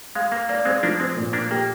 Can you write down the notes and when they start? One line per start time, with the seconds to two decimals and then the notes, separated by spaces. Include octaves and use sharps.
0.15 G#3 F5
0.32 A#3
0.49 A#3 D5
0.65 G#3 C4
0.83 F3 A#3 D4
1.00 G#3 C4
1.16 A#2
1.33 A#3 D4
1.51 A#3 G4